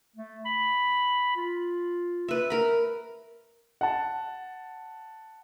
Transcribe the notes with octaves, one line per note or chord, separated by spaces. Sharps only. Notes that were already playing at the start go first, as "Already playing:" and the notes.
A3
B5
F4
B4 E5
A#4 B5
F#5 A5